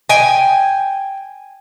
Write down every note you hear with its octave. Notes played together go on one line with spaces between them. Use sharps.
G5 G#5